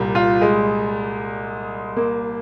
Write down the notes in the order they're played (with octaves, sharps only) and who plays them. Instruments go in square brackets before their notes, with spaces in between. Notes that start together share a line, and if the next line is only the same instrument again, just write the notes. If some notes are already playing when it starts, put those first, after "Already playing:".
Already playing: [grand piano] C2 A#2 G3
[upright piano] F4
G#3
A#3